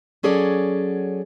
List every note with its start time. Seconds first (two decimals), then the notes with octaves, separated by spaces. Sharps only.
0.23 F#3 C#4 G#4 A4 D5